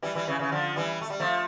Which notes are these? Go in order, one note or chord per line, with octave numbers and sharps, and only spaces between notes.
E3 G3
E3 G3
C#3 E3
C#3 E3
D3 F3
E3 G3
A3
G3
F3 A3